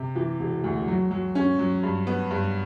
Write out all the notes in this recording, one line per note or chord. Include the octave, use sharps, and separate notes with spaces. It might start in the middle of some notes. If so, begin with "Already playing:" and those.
Already playing: C3
E3
E1
D2
F#3
F#3
C#4
F#3
G2
B3
G2